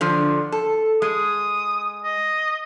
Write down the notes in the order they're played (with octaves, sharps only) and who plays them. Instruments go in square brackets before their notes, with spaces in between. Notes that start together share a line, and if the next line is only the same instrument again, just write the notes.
[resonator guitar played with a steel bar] D3 F3
A4
[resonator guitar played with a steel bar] G#3 [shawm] D#6
[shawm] D#5